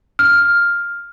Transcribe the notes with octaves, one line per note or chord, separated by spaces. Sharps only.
F6